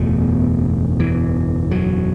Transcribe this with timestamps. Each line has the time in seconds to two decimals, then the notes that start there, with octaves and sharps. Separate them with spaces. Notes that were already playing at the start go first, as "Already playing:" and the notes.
Already playing: F#1 E2 B2 A3
1.00 E3
1.71 F#3